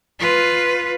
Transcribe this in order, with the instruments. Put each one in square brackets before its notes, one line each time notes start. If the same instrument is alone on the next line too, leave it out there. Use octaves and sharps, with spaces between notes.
[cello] F4 B4